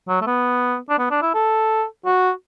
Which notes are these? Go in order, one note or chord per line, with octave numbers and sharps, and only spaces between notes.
F#3
A3
B3
D4
B3
D4
E4
A4
F#4